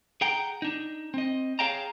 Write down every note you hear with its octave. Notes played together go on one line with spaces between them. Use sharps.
G#4 F#5 G5 A#5
D4 D#4
C4 D#5
G#4 C#5 F5 G5 A5 A#5